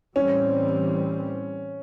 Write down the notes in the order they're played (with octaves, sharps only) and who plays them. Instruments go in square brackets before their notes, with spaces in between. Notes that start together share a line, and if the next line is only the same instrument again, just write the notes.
[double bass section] A2 E3 G3 C4 [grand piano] C#4